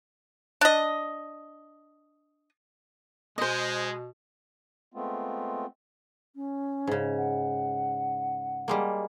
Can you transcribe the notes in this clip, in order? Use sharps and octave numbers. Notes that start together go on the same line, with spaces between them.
D4 D#5
B2 G#3 C5 D#5
G#3 A3 B3 C4 F4
C#4
G#2 C#3
F#5
G3 G#3 A#3